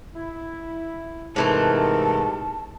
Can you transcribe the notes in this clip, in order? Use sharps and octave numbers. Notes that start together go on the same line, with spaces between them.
E4
G#2 C3 E3 A3 D#4 A#4 A5